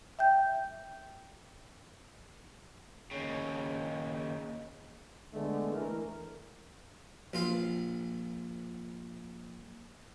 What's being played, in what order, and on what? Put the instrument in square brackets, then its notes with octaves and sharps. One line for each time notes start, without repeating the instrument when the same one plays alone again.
[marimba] E5 G5 G6
[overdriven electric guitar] D#2 C#3
[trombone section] D3 G#3 A3 B3
E3 A3 A#4
[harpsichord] A#1 F4 F5